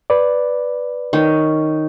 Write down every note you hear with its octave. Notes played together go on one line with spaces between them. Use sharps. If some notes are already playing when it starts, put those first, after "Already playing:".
B4 D5
D#3 C#4